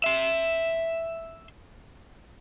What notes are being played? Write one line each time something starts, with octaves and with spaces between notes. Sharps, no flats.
E5 C6